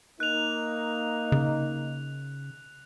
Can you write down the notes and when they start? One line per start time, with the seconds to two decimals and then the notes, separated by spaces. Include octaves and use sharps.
0.20 A#3 D#4 F#6 F7
1.32 C#3